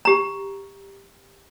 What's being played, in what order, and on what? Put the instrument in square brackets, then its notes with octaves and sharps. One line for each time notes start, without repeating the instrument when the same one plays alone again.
[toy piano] G4 A#5